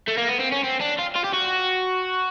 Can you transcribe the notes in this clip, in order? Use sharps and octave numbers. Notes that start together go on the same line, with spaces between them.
A3
A#3
B3
C4
C#4
C4
D4
F4
F4
G4
F#4